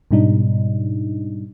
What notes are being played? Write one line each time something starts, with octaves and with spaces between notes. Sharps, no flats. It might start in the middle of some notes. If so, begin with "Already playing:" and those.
G#2 B2 G3 D4 D#4